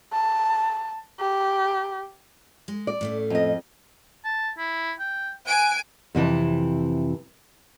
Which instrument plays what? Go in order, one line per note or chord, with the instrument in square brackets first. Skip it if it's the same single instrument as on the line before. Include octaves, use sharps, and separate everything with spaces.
[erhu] A5
G4
[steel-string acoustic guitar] G#3
[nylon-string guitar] D5
[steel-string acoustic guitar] A2 A3 C#4
[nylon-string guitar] F2 D#5
[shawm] A5
E4
G5
[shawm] F#5 [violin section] G#5 D7
[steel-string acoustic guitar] F2 C3 E3 A5